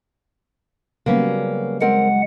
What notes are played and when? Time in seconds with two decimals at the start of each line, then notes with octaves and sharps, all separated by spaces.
1.06 C#3 F#3 G3 A#3 B3 C#4
1.82 G#3 C4 A#4 F#5